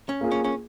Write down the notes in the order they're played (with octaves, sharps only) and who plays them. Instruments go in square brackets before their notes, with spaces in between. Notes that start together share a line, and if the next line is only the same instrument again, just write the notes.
[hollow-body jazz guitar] C#4
[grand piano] A#3 F4 G#4
[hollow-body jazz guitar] C#4
C#4